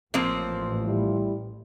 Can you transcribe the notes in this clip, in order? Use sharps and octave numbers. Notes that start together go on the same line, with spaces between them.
A1 F3 A#3 C4
G3 E4